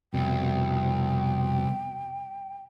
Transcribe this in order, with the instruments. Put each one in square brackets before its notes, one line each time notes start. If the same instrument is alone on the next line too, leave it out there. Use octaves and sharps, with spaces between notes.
[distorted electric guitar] C2 [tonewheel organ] F2 B2 [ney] G5